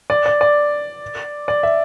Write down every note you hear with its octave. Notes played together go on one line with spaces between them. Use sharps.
D5
D5
D5
D5
E5